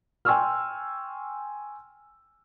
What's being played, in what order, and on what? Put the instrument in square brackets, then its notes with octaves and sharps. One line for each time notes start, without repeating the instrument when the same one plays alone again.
[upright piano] G5 G#5 C6 C#6 E6 F6